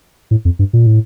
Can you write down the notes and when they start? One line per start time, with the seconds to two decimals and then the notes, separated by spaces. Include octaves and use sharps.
0.31 A2
0.45 F2
0.59 G2
0.73 A#2
0.87 A2